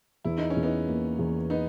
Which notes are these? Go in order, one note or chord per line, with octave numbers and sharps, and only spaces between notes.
E2 E4
D#4
C#4
E2
B3 D#4
A#3
E2
B3 D#4